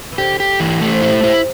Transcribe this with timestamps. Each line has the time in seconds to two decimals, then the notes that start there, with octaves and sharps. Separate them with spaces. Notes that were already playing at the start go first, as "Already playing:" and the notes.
0.12 E3
0.18 D3 G4
0.40 G4
0.60 E3
0.81 C3 A3
0.89 D3
0.98 C3
1.02 E4
1.13 C3
1.24 E4